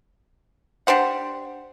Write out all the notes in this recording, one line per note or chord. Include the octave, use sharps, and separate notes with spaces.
D4 G4 C5 F#5